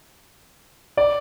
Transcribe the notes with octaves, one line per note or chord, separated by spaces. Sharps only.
D5